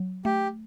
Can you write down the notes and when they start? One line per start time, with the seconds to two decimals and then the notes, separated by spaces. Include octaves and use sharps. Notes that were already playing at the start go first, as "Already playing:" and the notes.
Already playing: F#3
0.25 A3 G4